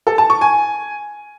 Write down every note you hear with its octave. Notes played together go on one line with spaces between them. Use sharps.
A4
A5
C#6
G#5